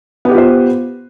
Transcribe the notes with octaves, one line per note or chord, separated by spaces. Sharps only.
B3 F4 G4 B4 C5